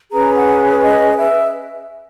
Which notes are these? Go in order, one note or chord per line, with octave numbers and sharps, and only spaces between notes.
C#4 G#4 B4 A#5
F#5
D#5
E5